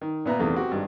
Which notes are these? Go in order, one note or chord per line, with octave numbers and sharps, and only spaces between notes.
D#3
A#2 B3 E5 A#5
E2 C3 D#3 A3
C4 F#4 G4
G#1 G2